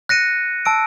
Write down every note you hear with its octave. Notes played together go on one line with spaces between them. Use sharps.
F#6 A#6 C#7 D#7
A5 E6 D7